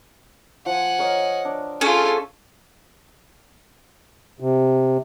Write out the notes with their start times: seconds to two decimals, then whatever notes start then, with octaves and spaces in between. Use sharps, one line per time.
0.66 F3 F#5 G#5
0.99 A#4 C#5 D#5
1.45 D4
1.81 A3 C#4 F4 G#4 A4 G#5
4.40 C3